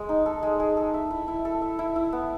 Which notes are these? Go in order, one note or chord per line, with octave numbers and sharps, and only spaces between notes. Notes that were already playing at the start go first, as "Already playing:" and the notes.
Already playing: G#3
D#4
A4
G#3
G#3
A4
E5
E4
E4
A4
E5
E4
E4
B3